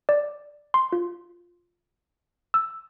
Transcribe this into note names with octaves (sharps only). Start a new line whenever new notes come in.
D5
C6
F4
E6